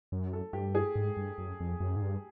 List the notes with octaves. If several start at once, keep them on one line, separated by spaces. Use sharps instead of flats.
F#2
A4
G2 G4
G#4
G#2
G2
F#2
F2
F#2
G#2
G2